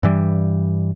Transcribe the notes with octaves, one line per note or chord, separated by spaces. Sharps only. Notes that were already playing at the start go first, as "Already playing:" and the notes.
G2 E3 G3